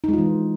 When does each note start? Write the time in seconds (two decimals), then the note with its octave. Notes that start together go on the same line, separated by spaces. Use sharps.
0.04 D#4
0.09 G#3
0.13 F4
0.18 E3